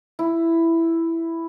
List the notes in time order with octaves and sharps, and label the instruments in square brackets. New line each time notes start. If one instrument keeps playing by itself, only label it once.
[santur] E4